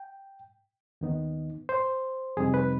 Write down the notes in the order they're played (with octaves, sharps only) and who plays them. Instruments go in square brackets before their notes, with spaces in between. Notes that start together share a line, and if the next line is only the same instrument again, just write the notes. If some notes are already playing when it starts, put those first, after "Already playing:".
Already playing: [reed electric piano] G5
D#2 D#3 B3 D#4
C5
F2 C3 G3 C4 D#4 G#4
B4